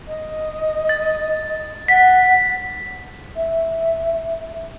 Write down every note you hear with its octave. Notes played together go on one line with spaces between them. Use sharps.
D#5
A6
F#5 B6
E5